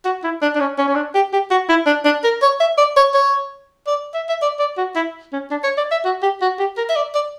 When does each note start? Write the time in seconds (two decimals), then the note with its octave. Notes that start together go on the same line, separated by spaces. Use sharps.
0.05 F#4
0.24 E4
0.42 D4
0.55 D4
0.60 C#4
0.78 C#4
0.88 C#4
0.95 D4
1.15 G4
1.33 G4
1.51 F#4
1.69 E4
1.86 D4
2.05 D4
2.24 A#4
2.42 C#5
2.60 E5
2.78 D5
2.96 C#5
3.14 C#5
3.87 D5
4.14 E5
4.29 E5
4.42 D5
4.59 D5
4.78 F#4
4.96 E4
5.33 C#4
5.51 D4
5.64 C#5
5.77 D5
5.91 E5
6.05 F#4
6.23 G4
6.41 F#4
6.59 G4
6.77 A#4
6.89 E5
6.96 D5
7.14 D5